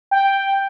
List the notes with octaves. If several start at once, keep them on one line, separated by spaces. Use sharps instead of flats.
G5